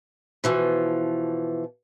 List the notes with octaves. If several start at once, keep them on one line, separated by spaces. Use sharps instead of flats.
B2 E3 F3